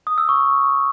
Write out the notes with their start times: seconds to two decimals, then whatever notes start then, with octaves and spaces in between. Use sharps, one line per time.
0.07 D#6
0.18 E6
0.29 C#6